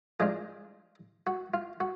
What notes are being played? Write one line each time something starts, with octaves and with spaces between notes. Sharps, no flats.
F3 G#3 D4 F4 G#4
F#4
F4
F#4